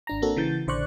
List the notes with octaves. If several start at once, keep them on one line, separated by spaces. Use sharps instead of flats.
G#1 D4 A#5
A#3 C4 D4 F#4 A4
C#3 E3 G6 A6
A#1 D3 C5 D5 C#6 F#6